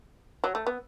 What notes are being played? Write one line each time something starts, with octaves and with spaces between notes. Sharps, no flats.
F#3
A3
B3